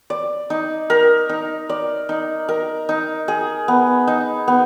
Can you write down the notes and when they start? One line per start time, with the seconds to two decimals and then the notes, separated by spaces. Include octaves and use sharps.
0.10 D5
0.50 D#4
0.90 A#4
1.29 D#4
1.69 D5
2.09 D#4
2.49 A#4
2.89 D#4
3.28 G#4
3.68 B3
4.08 D#4
4.48 B3